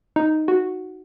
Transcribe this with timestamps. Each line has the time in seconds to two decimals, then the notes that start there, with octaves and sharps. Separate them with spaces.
0.16 D#4
0.48 F#4